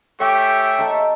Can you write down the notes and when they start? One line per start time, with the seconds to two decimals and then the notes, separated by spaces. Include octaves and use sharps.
0.21 A3 G4 C#5 E5 G5 G#5
0.79 D#4 A4